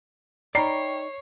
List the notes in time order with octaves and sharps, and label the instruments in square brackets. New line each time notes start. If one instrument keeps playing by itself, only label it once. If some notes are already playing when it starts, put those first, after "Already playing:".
[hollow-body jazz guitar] D#4 D5 [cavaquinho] A#4 G5 B5 [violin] C#5 [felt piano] C7